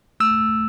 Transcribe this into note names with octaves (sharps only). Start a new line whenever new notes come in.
A3 E6